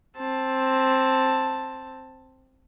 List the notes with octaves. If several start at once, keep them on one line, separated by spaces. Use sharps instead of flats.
C4 A5